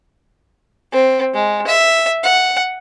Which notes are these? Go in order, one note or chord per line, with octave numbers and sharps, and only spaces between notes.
C4
G#3
E5
F#5